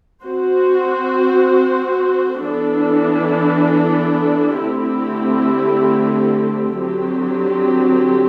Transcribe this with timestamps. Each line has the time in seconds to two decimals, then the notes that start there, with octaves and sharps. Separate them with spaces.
0.24 C4 F#4 C5
2.42 E3 B3 D4 A4
4.60 D3 A3 C4 E4 G4
6.78 D3 F#3 C4 G4